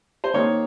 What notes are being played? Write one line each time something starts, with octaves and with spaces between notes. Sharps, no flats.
C5
D#3 A#3 D#4 C#5